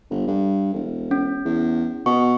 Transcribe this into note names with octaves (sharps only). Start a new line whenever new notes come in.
G1
G2
E1
C#4
E2
B2 C#6